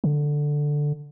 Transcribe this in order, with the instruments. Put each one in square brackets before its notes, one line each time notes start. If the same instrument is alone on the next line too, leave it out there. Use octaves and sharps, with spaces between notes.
[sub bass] C#3
D3